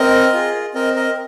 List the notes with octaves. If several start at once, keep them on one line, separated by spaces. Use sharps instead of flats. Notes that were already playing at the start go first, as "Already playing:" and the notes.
Already playing: C4 A#4 D#5
F4 G#4
C4 A#4 D#5
A#4 D#5